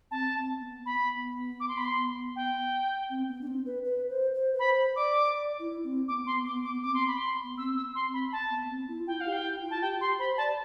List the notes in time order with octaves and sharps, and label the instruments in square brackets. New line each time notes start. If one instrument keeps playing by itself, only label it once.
[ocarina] C4 [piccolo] A5
[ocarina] C4
B3
[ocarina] B3 [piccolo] B5
[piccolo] D6
C6
B5
C6
G5
[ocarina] C4
B3
D4
C4
B4
B4
C5
C5
B4
[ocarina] C5 [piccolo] B5
[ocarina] D5 [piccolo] D6
[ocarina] D5
E4
C4
[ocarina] B3 [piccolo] D6
[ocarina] B3 [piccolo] C6
[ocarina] B3 [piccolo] D6
[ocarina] B3 [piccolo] D6
[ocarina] C4 [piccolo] D6
[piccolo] C6
B5
C6
[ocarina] B3
[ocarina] C4 [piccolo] E6
[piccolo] E6
C6
[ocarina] C4
[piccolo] B5
A5
[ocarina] B3
C4
E4
F4
[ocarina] E4 [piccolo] G5
[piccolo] F5
[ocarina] G4
[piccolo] G5
[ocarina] E4
F4
[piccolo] A5
[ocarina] G4 [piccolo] G5
[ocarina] G4 [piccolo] C6
[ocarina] C5 [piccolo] B5
[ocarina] D5 [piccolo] A5